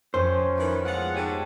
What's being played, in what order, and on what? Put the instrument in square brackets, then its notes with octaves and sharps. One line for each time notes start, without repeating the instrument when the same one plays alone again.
[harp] F2 F3 [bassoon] C#4 [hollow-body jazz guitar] C5
[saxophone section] D#3 E3
[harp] G#3 A3 B3 [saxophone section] F4 F#5
[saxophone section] G#2 [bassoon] G4 [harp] C#5 A5